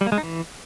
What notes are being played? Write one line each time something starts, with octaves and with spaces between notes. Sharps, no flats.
G3
A#3
G#3
D#4
E3